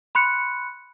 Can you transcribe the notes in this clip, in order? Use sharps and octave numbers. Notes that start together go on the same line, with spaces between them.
B5 C6 F#6 C#7